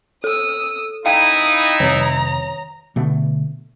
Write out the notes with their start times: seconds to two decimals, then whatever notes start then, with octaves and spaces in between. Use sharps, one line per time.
0.24 A4 D#6 E6
1.06 D#4 E4 F5 G5 D#6
1.80 F2 C3 D#3 C#5 A#5 D#6
2.96 B2 D3 A3